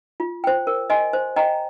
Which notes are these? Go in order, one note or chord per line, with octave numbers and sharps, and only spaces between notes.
F4
C5 G5
A#4
D#5 G#5 C6
C5
D#5 G5 A#5